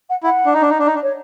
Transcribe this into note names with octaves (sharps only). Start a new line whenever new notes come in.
F#5
E4 F#5
D4
D#4
D4
D#4
D4
D#4
D4
C#5